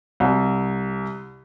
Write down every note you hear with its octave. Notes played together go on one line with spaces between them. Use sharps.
C2